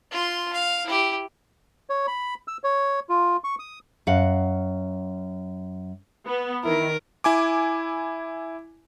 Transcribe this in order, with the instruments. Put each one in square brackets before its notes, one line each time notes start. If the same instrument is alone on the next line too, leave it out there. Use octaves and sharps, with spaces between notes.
[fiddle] F4 C6
F5
E4 G4
[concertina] C#5
B5
E6
C#5
F4
C#6
D#6
[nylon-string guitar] F#2 F5 F#5
[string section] B3
[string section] D#3 [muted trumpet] E4 [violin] A#4
[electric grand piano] E4 G#5 D6